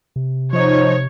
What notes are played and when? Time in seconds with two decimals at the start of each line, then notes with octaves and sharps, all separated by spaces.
0.16 C3
0.53 F3 D#4 C5 C#5